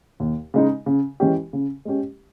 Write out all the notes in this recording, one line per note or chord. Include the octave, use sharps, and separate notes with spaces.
D#2
C#3 G#3 D#4
C#3
E3 G#3 C#4 G4
C#3
G#3 C#4 G4